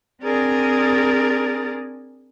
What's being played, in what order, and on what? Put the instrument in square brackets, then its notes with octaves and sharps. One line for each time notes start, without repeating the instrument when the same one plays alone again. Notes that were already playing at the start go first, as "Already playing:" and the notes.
[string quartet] C4 D4 G#4 A#4 D5